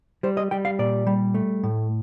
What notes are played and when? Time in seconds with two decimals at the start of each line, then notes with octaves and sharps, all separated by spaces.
0.23 G3 C5
0.37 D#5
0.51 G3 G5
0.65 F5
0.79 A#2 D5
1.07 G3
1.34 A3
1.63 A2